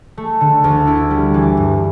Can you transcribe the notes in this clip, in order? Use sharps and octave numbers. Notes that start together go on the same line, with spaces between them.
A3
D3
D2
E4
G3
E3
G2